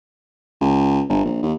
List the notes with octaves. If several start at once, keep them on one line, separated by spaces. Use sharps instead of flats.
C#2
G1
A#1
D#2